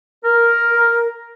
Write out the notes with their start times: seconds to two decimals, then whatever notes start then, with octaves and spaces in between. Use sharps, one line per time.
0.24 A#4